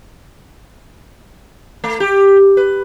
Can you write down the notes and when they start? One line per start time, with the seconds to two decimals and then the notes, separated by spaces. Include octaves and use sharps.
1.84 A3
2.00 G4
2.57 B4